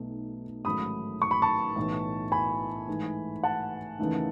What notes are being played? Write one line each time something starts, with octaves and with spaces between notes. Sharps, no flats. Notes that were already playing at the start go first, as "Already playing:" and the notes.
Already playing: B1 B2 A3 D#4
A1 G#2 D#3 F#3 A3 B5 D#6
C#6
B5
A5 C#6
B1 A2 E3
G#5 B5
G#2 E3 A3 D#4
F#5 A5
D#2 C#3 E3 A3 D#4